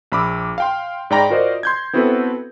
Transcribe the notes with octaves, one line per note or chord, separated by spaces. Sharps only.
A#1 B5 D6 E6
F5 G5 C6
G#2 D5 G5 A#5 B5 A#6
F4 F#4 A#4 C5 D5 D#5
C6 G6 G#6
B3 C4 E4 F#4 A4 B4